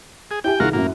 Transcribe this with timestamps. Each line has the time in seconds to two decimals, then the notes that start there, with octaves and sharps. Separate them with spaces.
0.31 G#4
0.44 E4 G4 G5 G#5
0.60 C2 D#3 F4 F#4 G#4 A#4
0.73 F#2 A2 A#3 F#4